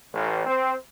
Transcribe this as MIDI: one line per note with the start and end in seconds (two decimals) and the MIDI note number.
0.14 0.43 33
0.46 0.73 60